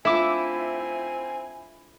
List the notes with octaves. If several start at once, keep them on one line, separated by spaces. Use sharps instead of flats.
A3 C4 D4 E4 F4 E5 G#5 D6